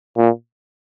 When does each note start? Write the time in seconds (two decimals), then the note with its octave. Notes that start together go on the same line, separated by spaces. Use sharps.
0.17 A#2